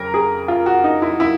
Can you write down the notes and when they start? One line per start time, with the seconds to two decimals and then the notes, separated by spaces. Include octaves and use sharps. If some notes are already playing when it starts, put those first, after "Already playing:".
Already playing: F2 C#3 F#3 A#4
0.14 G#4
0.48 F4
0.66 F#4
0.84 D#4
1.02 E4
1.20 E4